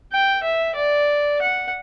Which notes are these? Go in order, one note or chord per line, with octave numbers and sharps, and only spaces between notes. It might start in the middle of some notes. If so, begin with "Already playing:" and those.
G5
E5
D5
F#5